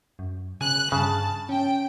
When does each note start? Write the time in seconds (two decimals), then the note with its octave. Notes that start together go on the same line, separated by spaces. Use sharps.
0.19 F#2
0.61 C#3 G#5 F#6
0.92 G2 C#3 A5
1.49 C#4 G5